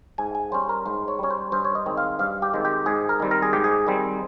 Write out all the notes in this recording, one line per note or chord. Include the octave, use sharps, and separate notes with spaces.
G#2 G#5
G#5
G3 C#4 C5
A#4
G#2 C5
C#5
G3 C#4 C#5
C5
G2 C5
C#5
D#5
D#3 G#3 C4
F5
G2 F5
G4
D#3 G#3 C4
G4
G#2 G#4
A#4
D#3 G3 C4
A#4
G#4
G#2 G4
G#4
D#3 G3 C4